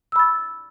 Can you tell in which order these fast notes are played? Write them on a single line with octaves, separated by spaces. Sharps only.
E6 B5 A6